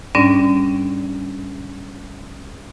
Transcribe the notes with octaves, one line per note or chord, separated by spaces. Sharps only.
G#2 G3 C#4 D4 D5